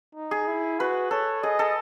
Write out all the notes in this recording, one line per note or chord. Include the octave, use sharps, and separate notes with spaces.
D#4
G#4
E4
F#4 B4
A4 C#5
G#4 D#5
A4